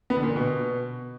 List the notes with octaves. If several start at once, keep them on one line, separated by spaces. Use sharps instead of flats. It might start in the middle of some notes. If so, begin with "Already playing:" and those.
B3
D3
A#2
D3
B2